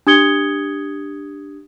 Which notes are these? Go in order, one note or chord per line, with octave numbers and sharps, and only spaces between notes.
D4 G4 D#6 G#6 C#7 G7